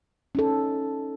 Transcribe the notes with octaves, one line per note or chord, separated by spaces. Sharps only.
C#4 D#4 A4